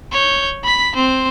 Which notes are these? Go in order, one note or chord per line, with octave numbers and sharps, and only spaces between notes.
C#5 G6
B5 B6
C4 C5